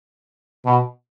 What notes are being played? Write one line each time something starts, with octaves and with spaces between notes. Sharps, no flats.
B2